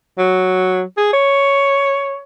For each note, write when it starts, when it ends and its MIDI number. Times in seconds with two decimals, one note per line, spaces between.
0.18 0.83 54
0.97 1.10 68
1.13 2.22 73